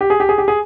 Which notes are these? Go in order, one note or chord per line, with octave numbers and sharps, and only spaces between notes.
G4
G#4
G4
G#4
G4
G#4